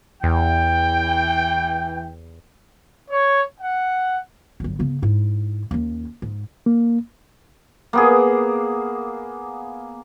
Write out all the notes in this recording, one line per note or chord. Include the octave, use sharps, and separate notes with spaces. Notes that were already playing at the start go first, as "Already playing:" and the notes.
E2 E3 G5
C#5
F#5
G1 F#3
C#3 B3
G#2 E4
D#2 C#4
G#2
A#3
A#3 B3 G#4